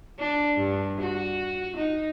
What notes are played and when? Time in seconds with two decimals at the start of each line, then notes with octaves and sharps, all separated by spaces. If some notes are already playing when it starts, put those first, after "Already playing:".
0.19 D4
0.57 G2
1.00 F#4
1.76 D#4